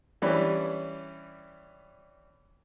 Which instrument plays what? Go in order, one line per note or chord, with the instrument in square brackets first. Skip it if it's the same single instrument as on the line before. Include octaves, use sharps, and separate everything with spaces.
[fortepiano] E3 G3 C#4 D4 B4